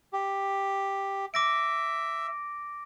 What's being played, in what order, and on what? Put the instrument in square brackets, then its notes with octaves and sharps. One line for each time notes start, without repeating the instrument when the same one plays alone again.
[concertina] G4
[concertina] E5 [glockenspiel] D6 A#6 D7